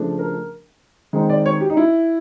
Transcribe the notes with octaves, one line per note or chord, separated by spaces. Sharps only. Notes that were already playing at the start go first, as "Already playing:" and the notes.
Already playing: C#3 F3 A3 D4
A#4
D#3 G#3 C4 D#4
D5
C#5
G4
D#4
E4